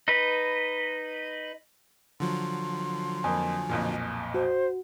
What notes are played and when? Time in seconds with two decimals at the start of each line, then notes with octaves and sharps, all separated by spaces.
0.08 D#4 B4
2.20 D3 F3 F#3 C6
3.24 F2 A#3 G#5
3.69 B1 F2 A#2
4.34 F#4 C5